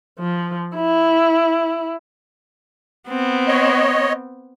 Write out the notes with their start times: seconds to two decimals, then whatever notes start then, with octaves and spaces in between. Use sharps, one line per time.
0.19 F3
0.76 E4
3.09 B3 C4
3.48 C#5 D#5